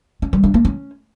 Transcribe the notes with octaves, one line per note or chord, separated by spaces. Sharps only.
C#4
G3
D4
A#3
C#4